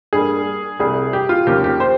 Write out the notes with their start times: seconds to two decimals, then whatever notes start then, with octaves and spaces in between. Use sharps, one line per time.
0.13 G2 G3 A#3 G#4
0.79 C2 C3 G3 G#4
1.13 G4
1.29 F4
1.47 D#2 C#3 F3 A#3 G4
1.64 G4
1.80 C5